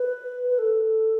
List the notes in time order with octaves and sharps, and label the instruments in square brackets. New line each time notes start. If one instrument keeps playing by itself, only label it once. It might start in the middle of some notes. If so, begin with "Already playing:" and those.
Already playing: [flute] B4
B4
A4